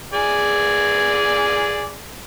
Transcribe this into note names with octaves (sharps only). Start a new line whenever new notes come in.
G#4 D5 G#5